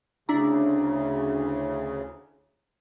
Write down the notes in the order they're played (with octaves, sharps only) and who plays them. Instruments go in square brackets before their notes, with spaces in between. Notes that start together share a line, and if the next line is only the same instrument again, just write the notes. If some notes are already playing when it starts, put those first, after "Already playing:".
[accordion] D2 C#3 [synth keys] D4 E4 A#5